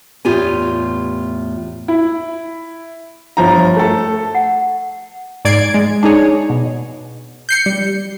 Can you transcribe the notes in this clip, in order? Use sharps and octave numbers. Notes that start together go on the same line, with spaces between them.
E2 A2 F4 G4 G#5
E4
G1 F3 A#5
A3 A4
F#5
G#2 D5 G#6 C7 D7
G#3
D4 D#4 G#4 C#5
B2
G6 C7 C#7
G3